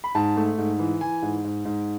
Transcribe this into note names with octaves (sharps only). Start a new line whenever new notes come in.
B5
G#2 A5
A3
G#2
E3
E3 G#5
G#2
G#2
G#2